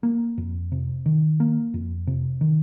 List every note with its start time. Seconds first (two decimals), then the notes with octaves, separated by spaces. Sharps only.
0.03 A#3
0.38 F2
0.72 C3
1.06 D#3
1.40 A#3
1.74 F2
2.07 C3
2.41 D#3